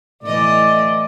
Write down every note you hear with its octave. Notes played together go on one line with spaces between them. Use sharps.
A2 E3 D5 D#5